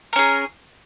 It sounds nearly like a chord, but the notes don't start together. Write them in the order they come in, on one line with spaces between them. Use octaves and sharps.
A#4 C#4 G#4